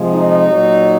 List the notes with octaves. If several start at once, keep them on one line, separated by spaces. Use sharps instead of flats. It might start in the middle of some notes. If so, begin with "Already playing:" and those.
Already playing: C3 F3 G#3
D#4
A#2 F#3